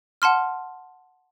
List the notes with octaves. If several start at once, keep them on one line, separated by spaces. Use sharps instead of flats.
F#5 A5 C6 F6